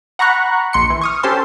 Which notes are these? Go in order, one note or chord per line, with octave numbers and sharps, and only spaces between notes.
F#5 A#5 B5 C#6 F#6
A#1 C6 C#7
E3
C#6 D#6 F6
C#4 G4 A4 C5 A5 C6